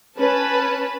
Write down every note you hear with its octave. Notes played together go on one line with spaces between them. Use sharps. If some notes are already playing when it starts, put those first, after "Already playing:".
C#4 B4 A5 B5